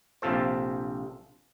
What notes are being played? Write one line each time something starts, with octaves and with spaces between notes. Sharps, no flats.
A#1 C3 F4 A4 C5